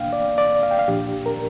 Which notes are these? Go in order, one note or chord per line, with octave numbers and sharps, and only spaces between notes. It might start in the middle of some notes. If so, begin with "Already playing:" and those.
Already playing: A#2 A#3 D4 F5 G5
D5
D5
F5
G5
F5
A#2 F3 D4 G4
A#4